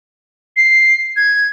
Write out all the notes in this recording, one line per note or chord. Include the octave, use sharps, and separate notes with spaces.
C7
G#6